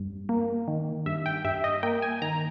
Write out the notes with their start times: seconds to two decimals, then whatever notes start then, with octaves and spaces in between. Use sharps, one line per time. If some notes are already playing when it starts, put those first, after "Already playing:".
Already playing: G2
0.29 A#3
0.68 D#3
1.06 G2 E5
1.26 G5
1.45 G2 E5
1.64 D#5
1.83 A#3 G5
2.02 G#5
2.22 D#3 A#5